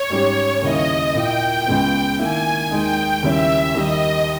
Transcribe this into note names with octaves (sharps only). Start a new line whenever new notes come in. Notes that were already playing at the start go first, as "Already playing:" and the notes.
Already playing: C#5
G#2 G3 C#4 G4
D#2 C#3 G3 A#3 E4 D#5
A#2 A#3 E4 G5
C#2 C#3 G#3 B3
D#3 A#3 E4 G#5
D#2 D#3 G#3 D#4 G5
D#2 C#3 G3 C#4 E4 E5
D#2 D#3 G3 D#5